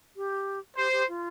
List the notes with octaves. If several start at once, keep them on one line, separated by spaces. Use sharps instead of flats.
G4
G4 C5
G4
F4